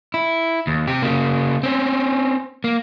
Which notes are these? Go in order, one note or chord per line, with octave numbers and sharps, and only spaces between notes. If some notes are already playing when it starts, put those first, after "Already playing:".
E4
D#2
C3 G4
C#3 A#3
C4 C#4
A#3